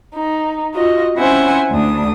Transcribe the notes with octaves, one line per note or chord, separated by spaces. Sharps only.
D#4
F4 F#4 D#5
C4 C#4 E4 C5 F#5 G#5
D2 D4 D#6